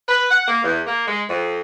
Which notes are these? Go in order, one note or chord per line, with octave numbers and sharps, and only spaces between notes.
B4
F#5
A#3
E2
A#3
G#3
F2